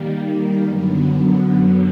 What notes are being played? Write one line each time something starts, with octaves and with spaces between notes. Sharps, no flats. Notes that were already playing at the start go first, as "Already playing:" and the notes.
Already playing: D#3 G3 A#3
F#2 D3 F#3 B3